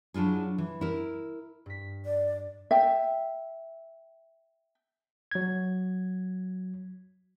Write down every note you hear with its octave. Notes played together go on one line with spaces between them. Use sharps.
F#3 D4 E4 F4 G#4
E3
E4 A#4
G2 B6
D5
E5 G5
F#3 G#6